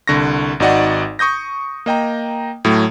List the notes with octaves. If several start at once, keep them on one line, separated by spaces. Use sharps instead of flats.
C2 D3 C#6 A#6
G#1 D#4 F#4 D5 D#5 F#5
C#6 D#6 G6 A#6
A#3 D#5 G5 A#5
A2 F#3 A3